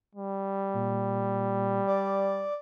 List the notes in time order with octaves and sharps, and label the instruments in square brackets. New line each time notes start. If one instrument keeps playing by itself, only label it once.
[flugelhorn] G3
[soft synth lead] A#2
D5